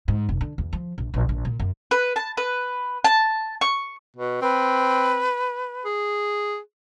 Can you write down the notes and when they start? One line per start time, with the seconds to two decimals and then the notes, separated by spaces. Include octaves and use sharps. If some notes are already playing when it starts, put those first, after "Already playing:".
0.08 G#2
0.29 F1
0.41 D3
0.58 E2
0.73 F3
0.98 A#1
1.14 A#1
1.29 A#1
1.45 A#2
1.60 F#2
1.91 B4
2.16 A5
2.37 B4
3.04 A5
3.61 C#6
4.17 B2
4.41 C4 B4
5.85 G#4